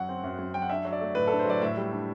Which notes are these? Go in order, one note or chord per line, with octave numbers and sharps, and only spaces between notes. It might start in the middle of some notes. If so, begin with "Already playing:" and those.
Already playing: F#2 F#3 F#5
C4
F#2
F#2
F#3 G5
F#5
D4 E5
F#3
D5
A3
A2 B4
D4 A4
C5
F#3 D5
A2 E5
G3
D4